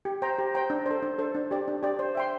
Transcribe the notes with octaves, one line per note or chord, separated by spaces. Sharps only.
G4
C5 G5 A#5
G4
C5 G5 A#5
D4
A4 C5
D4
A4 C5
D4
G4 D5
D4
G4 D5
C5
E5 G5 C6